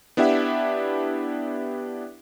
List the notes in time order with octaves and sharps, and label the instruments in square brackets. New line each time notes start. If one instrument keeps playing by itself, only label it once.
[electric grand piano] B3 D4 E4 G4 E5 F#5